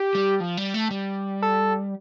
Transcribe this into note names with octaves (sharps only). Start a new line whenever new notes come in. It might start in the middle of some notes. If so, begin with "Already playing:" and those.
Already playing: G4
G3
F3
G3
A3
G3
A4